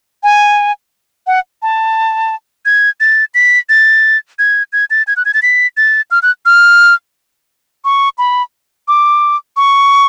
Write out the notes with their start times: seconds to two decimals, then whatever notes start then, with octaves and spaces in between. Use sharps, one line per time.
0.23 G#5
1.27 F#5
1.62 A5
2.65 G#6
3.00 A6
3.34 B6
3.69 A6
4.39 G#6
4.73 G#6
4.90 A6
5.07 G#6
5.16 F#6
5.25 G#6
5.34 A6
5.42 B6
5.77 A6
6.11 F6
6.23 F#6
6.45 F6
7.85 C#6
8.18 B5
8.88 D6
9.57 C#6